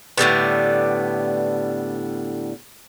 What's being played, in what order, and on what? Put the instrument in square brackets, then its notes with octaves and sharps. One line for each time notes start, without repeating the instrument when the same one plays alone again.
[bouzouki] A2 D3 G3 B3